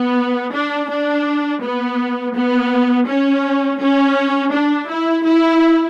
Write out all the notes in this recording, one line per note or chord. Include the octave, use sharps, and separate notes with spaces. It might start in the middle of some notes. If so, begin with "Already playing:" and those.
Already playing: B3
D4
D4
B3
B3
C#4
C#4
D4
E4
E4